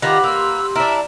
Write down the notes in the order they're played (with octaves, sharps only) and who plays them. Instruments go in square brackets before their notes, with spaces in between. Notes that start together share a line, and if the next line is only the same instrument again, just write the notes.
[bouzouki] D#3 F4 [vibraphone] G4 F#5 D6 [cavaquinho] B4 [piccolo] A#6
[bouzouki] A#3 [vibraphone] G4 C6 [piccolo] E6
[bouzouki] D4 E4 [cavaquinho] A#4 [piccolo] E5